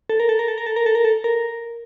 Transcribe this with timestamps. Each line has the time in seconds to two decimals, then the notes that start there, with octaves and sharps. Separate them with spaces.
0.09 A4
0.20 A#4
0.29 A4
0.39 A#4
0.48 A4
0.58 A#4
0.66 A4
0.76 A#4
0.86 A4
0.95 A#4
1.05 A4
1.24 A#4